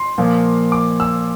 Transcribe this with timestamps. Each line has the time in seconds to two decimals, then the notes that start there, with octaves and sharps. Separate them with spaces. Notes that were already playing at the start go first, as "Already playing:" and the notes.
Already playing: C6
0.18 A#2 F3 A#3
0.72 D6
1.00 E6